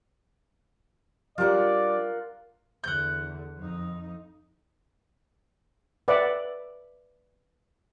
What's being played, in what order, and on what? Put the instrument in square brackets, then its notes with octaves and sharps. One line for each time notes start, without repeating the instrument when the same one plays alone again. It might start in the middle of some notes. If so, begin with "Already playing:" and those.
[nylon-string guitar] G3 D4 [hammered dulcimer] F4 A#4 F#5 [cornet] D5
[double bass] E2 D3 [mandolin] F#5 G6
[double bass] F2 D#4
[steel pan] B4 D5 E5 F#5